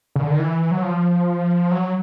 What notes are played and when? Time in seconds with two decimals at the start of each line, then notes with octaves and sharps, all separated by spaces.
0.16 C#3
0.23 D3
0.31 D#3
0.39 E3
0.71 F#3
0.83 F3
1.71 F#3